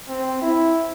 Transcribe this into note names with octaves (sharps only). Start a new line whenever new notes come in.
C4
E4